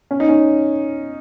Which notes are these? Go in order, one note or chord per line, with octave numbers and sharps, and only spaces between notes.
C#4
D#4
C#4